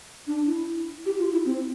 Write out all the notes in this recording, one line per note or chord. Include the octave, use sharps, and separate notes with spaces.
D4
E4
G4
F4
E4
C4